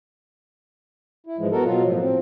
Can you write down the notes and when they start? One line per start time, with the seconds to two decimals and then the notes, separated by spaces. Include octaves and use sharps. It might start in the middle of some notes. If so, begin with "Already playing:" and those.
1.26 E4
1.38 G#2 E3 F3 G#3
1.52 B3 F#4 A4 A#4
1.65 B2 F#3 F4
1.83 A2 F3
2.00 C4